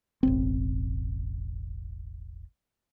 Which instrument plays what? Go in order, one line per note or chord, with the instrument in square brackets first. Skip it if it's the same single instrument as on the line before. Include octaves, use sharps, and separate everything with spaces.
[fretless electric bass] E1 A1 C4